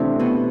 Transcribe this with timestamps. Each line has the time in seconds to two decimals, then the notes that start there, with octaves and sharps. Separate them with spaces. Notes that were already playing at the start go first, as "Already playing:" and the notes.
Already playing: C3 E3 A3 C4 D4
0.19 B2 B3